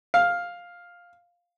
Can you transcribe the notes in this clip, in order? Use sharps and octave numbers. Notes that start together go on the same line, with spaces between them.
F5